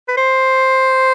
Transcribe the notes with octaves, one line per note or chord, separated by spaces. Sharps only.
B4
C5